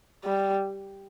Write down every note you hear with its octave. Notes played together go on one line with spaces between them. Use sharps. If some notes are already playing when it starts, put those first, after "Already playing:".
G3